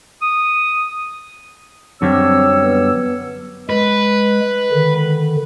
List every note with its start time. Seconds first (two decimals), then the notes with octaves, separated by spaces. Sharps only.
0.22 D#6
2.02 F#2 D3 G3 C4 C#5 E6
2.63 B3
3.70 G#3 B4
4.72 D3 D#3